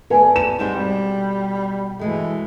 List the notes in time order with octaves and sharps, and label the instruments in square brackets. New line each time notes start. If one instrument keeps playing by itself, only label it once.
[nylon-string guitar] A3 A4 D5 [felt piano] B4 G#5
[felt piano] E7
[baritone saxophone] G#2 [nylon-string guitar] G3 C4 C5
[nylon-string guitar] B2 [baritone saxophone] G3
[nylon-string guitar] B2 G#3 A3 [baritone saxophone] E3